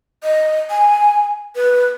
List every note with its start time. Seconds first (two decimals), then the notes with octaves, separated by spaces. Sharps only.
0.23 D#5
0.70 G#5
1.56 B4